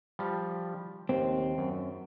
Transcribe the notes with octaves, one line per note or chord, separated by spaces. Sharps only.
F3 G3
D#2 C4
F#2